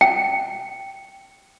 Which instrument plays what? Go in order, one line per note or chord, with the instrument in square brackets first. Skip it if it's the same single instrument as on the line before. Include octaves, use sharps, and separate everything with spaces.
[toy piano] G5